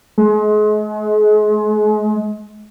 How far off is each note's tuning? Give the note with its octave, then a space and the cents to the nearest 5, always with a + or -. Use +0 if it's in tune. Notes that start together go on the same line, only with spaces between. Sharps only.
G#3 +35